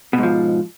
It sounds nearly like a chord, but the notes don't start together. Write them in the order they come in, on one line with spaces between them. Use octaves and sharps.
B2 G#2 F3